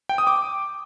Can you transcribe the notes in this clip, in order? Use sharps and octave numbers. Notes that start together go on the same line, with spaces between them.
G5
D#6
D6